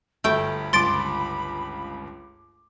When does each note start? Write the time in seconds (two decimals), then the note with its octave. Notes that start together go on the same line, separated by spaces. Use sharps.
0.24 G1 D2 A3 G5 B5
0.73 G1 C#2 C6 D6 A6 D7